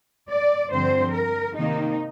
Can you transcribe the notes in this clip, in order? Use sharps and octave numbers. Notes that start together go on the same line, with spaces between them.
D5
G2 D3 F3 C4 C5
A#4
C3 D#3 A#3 D#4